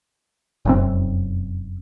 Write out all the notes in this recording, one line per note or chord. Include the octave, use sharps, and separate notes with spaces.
F1 F#2 C4